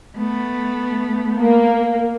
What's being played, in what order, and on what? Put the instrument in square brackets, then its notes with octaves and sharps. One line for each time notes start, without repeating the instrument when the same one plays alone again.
[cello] A3 B3
[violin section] A#3